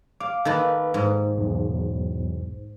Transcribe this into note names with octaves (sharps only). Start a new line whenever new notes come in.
F5 D6
D#3 A#3 A4 B4 A5
G#2
B1 E2